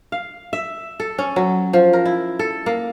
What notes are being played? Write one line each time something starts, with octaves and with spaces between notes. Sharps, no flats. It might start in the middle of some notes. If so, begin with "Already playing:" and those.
F5
E5
A4
C#4
F#3
F3
A#4
E4
A4
A#3